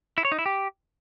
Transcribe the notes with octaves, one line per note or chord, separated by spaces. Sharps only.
E4
C#5
D#4
E4
G4